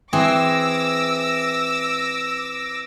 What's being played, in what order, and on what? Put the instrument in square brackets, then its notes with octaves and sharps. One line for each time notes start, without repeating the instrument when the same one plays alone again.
[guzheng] E3 C4 G#4 [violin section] D6 E6 A#6